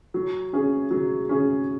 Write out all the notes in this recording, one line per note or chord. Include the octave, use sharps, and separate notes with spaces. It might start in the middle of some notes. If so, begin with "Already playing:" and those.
F#3
C#4 G#4
F#3
C#4 G#4